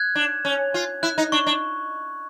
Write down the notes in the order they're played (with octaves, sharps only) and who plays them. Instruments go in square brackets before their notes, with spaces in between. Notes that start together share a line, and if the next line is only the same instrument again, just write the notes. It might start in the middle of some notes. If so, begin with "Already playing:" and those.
Already playing: [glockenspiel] F#6 G#6
[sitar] D4
C#4
F4
[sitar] E4 [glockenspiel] F#6
[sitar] D#4
[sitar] D4 [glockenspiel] C#6
[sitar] D4